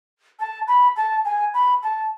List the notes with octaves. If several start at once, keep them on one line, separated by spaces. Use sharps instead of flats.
A5
B5
A5
G#5
B5
A5